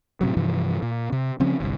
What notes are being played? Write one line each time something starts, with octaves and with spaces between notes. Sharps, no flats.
A2 C3 F#3
G2 C3 E3 F3
A#2
C3
C#3 F3 C4 C#4
G1 C2